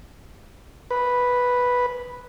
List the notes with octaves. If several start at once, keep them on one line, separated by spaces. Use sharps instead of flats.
B4